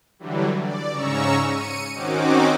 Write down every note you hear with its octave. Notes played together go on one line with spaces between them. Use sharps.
D3 E3 F#3 G3
D5
G#2 C#3 C#4 A#5 C#6 E6
C#7 D#7
D#3 C4 C#4 D#4 F#4 D6